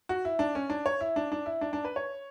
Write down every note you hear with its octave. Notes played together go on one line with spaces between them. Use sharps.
F#4
E4
D4
C#4
D4
C#5
E4
D4
D4
E4
D4
D4
B4
C#5